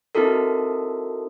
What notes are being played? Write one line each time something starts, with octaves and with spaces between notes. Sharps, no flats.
C4 D#4 E4 F#4 A4 A#4